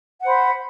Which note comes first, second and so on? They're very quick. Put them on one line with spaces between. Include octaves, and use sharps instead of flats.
F#5 C5 B5